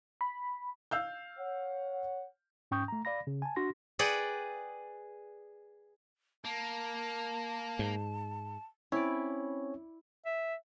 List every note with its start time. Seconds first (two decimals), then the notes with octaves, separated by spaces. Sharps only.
0.21 B5
0.91 F5 E6 G6
1.38 C#5 F#5
2.71 G#2 C#4 G5 C#6 D#6 G6
2.88 A3 A#5
3.05 D5 F5 B5 A#6
3.27 C#3
3.42 G#5 A5
3.56 D4 F#4 C6 A#6
3.99 G#4 B4 D5 F#5 G5
6.44 A#3 A5
7.79 G#2
8.92 C4 C#4 E4 C#5 D5
10.25 E5